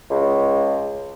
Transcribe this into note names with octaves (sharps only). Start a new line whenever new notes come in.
C#2